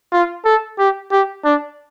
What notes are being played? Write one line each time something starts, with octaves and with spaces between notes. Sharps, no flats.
F4
A4
G4
G4
D4